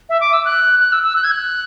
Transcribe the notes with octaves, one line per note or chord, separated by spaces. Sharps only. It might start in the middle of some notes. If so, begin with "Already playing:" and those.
E5
D6
E6
F#6
F#6
E6
E6
F#6
G#6
F#6